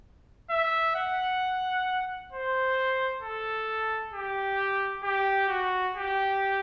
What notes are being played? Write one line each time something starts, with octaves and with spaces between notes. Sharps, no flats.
E5
F#5
C5
A4
G4
G4
F#4
G4